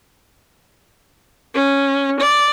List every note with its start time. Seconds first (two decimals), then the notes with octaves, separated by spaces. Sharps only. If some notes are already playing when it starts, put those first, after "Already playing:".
1.55 C#4
2.20 D5